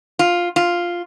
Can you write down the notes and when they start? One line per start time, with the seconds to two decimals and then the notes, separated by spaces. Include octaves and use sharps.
0.19 F4
0.56 F4